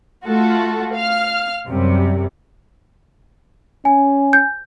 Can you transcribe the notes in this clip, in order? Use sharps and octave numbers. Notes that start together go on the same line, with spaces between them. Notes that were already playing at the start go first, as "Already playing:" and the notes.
A3 F4 F#4 A4
F5 F6
F#2 C3 G3
C#4 G#5
G6